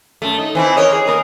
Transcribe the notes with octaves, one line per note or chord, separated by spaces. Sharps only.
F#2 A3
D#4
E3 C4 E4
A#4 C#5 D#5
G#4
A#3 A#4